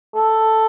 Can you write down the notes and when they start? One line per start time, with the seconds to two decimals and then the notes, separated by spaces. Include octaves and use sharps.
0.15 A4